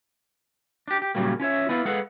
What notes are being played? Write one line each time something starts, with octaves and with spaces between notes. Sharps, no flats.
D4 G4
G4
A#2 C#3 F#3 G3 A#3
C#4 F4 C#5 E5
B3 E4 F4
G#3 G#4 A4 B4 F5 F#5